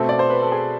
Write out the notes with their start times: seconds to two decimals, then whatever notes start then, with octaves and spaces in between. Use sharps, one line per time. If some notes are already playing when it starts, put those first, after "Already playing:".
Already playing: B2 A3 C4 A4
0.09 D5
0.19 C5
0.30 B4
0.42 A4
0.52 G#4